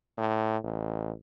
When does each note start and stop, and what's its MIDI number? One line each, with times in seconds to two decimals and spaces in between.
0.18 0.57 45
0.63 1.12 33